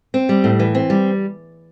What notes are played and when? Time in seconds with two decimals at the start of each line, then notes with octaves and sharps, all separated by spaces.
0.14 C4
0.29 G3
0.44 A2
0.59 E3
0.75 C4
0.90 G3